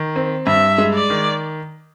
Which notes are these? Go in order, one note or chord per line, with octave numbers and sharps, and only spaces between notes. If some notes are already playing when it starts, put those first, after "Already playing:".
Already playing: D#3
C4
G2 E5
G#3
D5
D#3